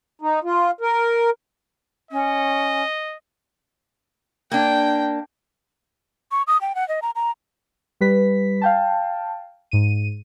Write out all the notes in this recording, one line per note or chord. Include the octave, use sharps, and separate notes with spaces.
D#4
F4
A#4
C#4 D#5
A#3 D4 G5
C#6
D#6
G5
F#5
D#5
A#5
A#5
G3 B4 B6
F5 G5 A5
G#2 D#7